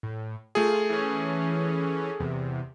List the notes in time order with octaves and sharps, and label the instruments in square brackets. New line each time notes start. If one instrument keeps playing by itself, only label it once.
[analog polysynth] A2
[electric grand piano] A3 G#4 [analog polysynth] F4
[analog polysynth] E3 C#4
E2 C3